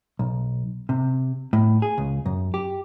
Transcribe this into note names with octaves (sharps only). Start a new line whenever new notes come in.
B1
C3
A2
G#4
C#2
F#2
G4